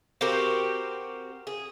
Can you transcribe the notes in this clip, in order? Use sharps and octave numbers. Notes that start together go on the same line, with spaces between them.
C4 F#4 G4 A#4
G#4